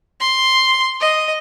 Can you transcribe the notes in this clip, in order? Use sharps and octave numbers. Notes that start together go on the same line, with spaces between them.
C6
D#5